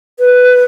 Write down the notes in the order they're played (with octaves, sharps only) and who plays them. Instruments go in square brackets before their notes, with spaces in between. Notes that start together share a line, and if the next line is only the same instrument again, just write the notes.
[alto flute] B4